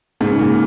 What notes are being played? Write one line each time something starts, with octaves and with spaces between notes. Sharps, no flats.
G#2 C#3
C#3
A#2